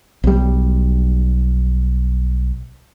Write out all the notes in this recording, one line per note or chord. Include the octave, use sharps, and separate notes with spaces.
B1 G3